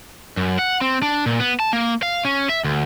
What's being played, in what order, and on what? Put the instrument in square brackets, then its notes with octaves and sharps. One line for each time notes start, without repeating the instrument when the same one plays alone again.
[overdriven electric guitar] F#2
F#5
C4
D4
A#2
B3
A5
A#3
F5
C#4
E5
D2